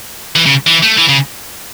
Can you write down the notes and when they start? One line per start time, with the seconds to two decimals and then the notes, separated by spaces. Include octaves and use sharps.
0.36 E3
0.46 C#3
0.67 E3
0.83 A3
0.98 E3
1.09 C#3